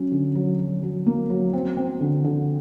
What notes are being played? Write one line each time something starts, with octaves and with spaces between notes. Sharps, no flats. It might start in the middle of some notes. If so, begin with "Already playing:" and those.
Already playing: F#3 C#4
D3
F#3
F#3
F#3
A#3
F#3
C4
C4
D3
D3